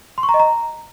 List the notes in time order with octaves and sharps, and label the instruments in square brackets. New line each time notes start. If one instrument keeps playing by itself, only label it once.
[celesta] C6
C#6
A#5
D#5
A#5